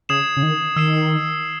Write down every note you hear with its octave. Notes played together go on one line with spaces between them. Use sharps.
C#3 D#6 G#6 C7 E7
C#3
D#3
D#3 E6 C7 E7